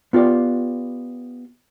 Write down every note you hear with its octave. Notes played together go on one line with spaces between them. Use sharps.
B3 F4 G4 D5